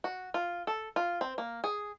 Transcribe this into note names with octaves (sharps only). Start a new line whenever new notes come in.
F#4
F4
A4
F4
C4
A#3
G#4